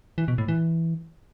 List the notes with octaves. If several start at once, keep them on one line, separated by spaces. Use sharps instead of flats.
E3
B2
A2
E3